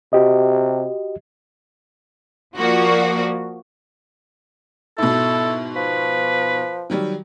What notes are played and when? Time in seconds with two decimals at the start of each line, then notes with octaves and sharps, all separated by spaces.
0.13 C3 F#4 G4 D#5
2.56 F3 A#3 F#4 D5
4.98 G#2 B2 E4 A4
5.76 F3 B4
6.90 D#3 F#3 G3